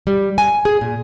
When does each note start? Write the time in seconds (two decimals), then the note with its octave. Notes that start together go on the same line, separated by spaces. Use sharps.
0.07 G3
0.38 G#5
0.65 G#4
0.81 A#2